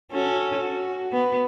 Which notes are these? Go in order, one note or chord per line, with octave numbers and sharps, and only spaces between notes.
C#4 F#4 A4
F#4
B3